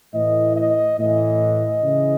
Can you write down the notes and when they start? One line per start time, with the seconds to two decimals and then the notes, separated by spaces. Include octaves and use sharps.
0.14 A2 E3 D#5
0.56 D#5
0.98 A2 E3 D#5
1.83 C#3 E3